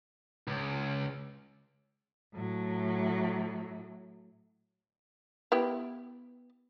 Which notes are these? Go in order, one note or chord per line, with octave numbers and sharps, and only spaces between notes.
C#2
A2 F#3
B3 E4 G4